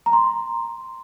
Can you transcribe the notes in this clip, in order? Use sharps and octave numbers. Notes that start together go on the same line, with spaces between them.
A#5
C6